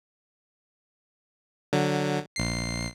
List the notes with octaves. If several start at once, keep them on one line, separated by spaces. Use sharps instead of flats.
D3 F#3
A#1 C7